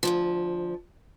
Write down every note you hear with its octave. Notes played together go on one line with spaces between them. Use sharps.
D2 G2 F3